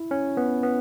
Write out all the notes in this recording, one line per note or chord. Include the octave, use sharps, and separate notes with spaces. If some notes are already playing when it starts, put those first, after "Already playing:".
Already playing: E4
C#4
B3
B3